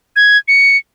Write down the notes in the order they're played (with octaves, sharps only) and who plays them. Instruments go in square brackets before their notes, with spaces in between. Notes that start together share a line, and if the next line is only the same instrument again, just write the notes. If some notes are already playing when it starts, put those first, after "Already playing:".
[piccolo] G#6
C#7